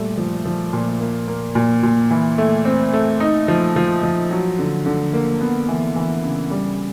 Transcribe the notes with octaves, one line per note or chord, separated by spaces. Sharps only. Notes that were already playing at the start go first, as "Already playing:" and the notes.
Already playing: A#2 G3 A3
F3
F3
A#2
A#3
A#3
A#2
A#2
E3
A3
C4
A3
D#4
F3
F3
F3
F#3
D3
D3
A#3
B3
E3
E3
C#3
G3